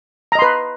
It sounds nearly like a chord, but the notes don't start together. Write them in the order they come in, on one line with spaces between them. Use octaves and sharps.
A#5 D#5 C6 B4